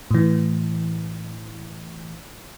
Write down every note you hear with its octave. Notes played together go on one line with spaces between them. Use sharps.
A2 E3